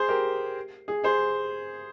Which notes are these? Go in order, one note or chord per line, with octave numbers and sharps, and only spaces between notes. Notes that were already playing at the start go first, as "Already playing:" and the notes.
Already playing: G#4 C5
G4 A#4
G#4
G#4 C5